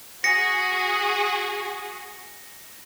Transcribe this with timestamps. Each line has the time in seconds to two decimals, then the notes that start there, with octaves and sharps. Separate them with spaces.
0.24 F#4 G#4 A#6 C#7